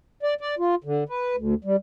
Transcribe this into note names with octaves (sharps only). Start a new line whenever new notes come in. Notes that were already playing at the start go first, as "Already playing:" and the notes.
D5
D5
F4
D3
B4
D2
G3